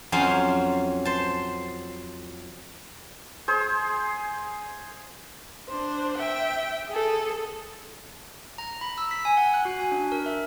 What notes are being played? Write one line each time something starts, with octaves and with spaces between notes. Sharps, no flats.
F2 F#3 C#4 C5 F5
C5 A5
G#4 C5
D4 C5
E5 G5
G#4 A4
A#5
B5
E6
B6
G#5
F#5
F#6
F#4
G#5
D4
A#4
E5